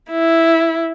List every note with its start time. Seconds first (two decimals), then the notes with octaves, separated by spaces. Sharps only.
0.11 E4